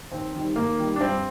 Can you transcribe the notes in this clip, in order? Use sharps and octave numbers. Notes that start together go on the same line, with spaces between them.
D#2 C4
D#3 G3
D#2 A#3
D#3 G3
D4
G2 C4